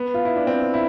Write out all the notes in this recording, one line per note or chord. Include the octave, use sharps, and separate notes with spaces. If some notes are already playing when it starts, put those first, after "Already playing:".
Already playing: B3
F4
E4
D4
C4
E4